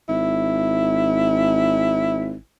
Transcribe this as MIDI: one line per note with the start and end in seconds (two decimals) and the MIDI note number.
0.09 2.37 32
0.09 2.38 64